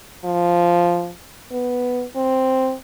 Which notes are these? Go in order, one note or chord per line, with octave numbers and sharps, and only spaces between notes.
F3
B3
C4